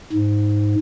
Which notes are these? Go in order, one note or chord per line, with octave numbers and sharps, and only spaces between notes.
G#2